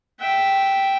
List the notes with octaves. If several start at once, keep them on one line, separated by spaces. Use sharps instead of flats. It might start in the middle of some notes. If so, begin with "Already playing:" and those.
E5 G5